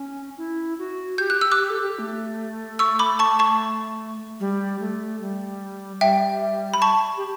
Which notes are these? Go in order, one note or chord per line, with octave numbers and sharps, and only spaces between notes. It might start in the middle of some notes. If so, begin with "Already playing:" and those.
Already playing: C#4
E4
F#4
G4 G6
F#6
E6
D6 F#6
G4
A4
G4
A3
C#6 E6
B5 D6
A5 C#6
A5 C#6
G3
A3
G3
G3 E5 G5
B5
A5 C#6
G4